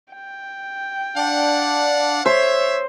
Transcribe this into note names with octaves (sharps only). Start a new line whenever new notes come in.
G5
D4 D5 F5 F#5
C5 C#5 E5